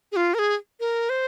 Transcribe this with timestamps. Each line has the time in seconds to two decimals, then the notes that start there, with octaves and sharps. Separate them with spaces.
0.12 G#4
0.16 F4
0.34 A#4
0.39 G#4
0.80 A#4
1.10 C5